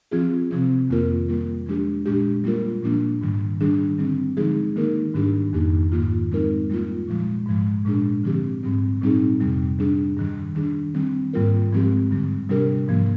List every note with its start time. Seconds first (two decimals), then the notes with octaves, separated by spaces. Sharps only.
0.11 F3 C4 F4 G#4
0.51 C3 F3 C4
0.89 F2 D#3 A#3 F4 A#4
1.28 G3 A#3 F4 A#4
1.66 F3 G#3 D4 G4
2.06 A#2 G#3 D4 G4
2.44 G3 A#3 F4 A#4
2.83 A#2 F3 A#3 D4
3.22 G#2 D#3 G3
3.60 D#3 G3 D4 G#4
3.99 D3 G3 C4
4.37 D3 F3 G#3 D#4 G#4
4.76 D#3 A#3 D#4 A#4
5.14 G#2 D#3 G3 D4 G4
5.53 F2 D#3 A#3 D#4 G4
5.92 G#2 D#3 A#3 F4
6.31 F3 G#3 C4 D#4 A#4
6.70 G3 A#3 F4
7.08 A#2 F3 G#3
7.46 G#2 F3 G#3
7.85 A#2 G#3 D4 G#4
8.24 D3 F3 C4 G4
8.63 G#2 G3 C4
9.01 A#2 G3 C4 D#4 G#4
9.40 F2 C3 G3
9.79 G3 D4 G#4
10.17 G2 D#3 G3
10.55 D#3 G3 D4 G#4
10.94 D#3 G3 C4
11.33 G#2 G3 A#3 F4 A#4
11.72 G#2 F3 G#3 C4 G4
12.11 G2 D3 G3
12.49 C3 G3 D4 G4 A#4
12.89 G#2 F3 A#3